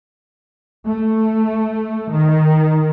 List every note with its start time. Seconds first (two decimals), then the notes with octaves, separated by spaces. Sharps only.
0.85 A3
2.10 D#3